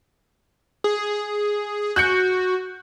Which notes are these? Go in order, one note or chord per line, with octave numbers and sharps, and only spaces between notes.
G#4
F#4 F#6 G6 C#7